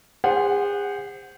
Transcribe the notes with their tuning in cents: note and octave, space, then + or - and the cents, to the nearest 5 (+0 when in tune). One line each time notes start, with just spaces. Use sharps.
G#4 -40 C5 +0 F#5 +0